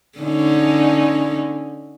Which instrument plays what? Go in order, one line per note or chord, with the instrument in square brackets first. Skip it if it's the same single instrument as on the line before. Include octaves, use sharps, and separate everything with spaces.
[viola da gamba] D3 C#4 D#4